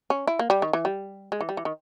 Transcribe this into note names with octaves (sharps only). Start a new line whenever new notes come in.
C#4
E4
A#3
G3
D#3
E3
G3
G#3
E3
G3
E3
D#3